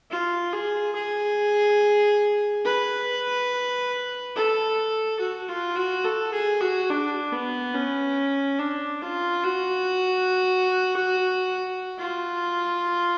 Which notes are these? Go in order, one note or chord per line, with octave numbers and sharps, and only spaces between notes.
F4
G#4
G#4
B4
A4
F#4
F4
F#4
A4
G#4
F#4
D4
B3
C#4
D4
F4
F#4
F4